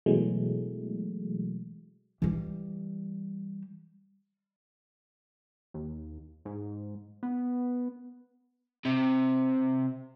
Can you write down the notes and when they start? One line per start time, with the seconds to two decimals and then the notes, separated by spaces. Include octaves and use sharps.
0.06 B2 E3 F#3 G#3 A3
2.22 E3 G3
5.74 D#2
6.45 G#2
7.23 B3
8.85 C3